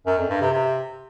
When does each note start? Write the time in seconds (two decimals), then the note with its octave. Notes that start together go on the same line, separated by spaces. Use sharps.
0.06 F#2
0.18 F2
0.29 G2
0.41 C3
0.53 C3